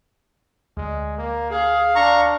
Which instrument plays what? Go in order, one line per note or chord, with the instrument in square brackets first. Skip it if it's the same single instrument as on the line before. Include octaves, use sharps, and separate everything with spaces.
[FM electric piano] D2 [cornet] G#3
[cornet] A#3
[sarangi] G#4 [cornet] F5
[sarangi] D4 [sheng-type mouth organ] A#5 C#6